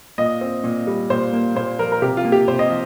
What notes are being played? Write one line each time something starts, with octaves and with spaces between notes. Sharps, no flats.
A#2 D#5
C4
A#2
G3
A#2 C5
A#3
A#2 C5
F3 A#4
A#4
C3 G4
F4
A#3
G4
C3 C5
D#5
F3